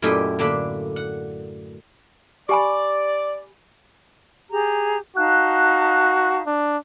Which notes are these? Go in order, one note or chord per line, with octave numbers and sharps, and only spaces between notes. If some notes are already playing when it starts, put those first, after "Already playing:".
F#2 A#2 A3 E4 G4 D#5
A2 D3 A#3 D4 B5
F#5
G4 D5 G#5 B5
G4 G#4 A#5
D#4 F#4 F5 A5 F#6
D4